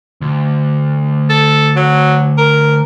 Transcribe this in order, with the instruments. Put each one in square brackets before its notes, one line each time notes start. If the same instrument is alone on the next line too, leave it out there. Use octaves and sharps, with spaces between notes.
[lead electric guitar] D2
[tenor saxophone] A4
F#3
A#4